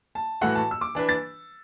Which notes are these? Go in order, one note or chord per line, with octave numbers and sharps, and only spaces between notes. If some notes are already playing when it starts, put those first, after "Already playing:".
A5
A2 E3 A3 F#4 F#5
A5
E6
D6
E3 D4 B4
A6